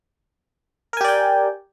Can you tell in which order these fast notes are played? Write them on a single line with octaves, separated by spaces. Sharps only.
A#4 G#5 G4 D5 G5